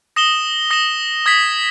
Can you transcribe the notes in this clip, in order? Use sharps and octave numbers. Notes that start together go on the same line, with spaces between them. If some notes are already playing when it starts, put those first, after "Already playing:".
D#6 A#6 E7 G7
D#6 A#6 E7 G7
D#6 G#6 B6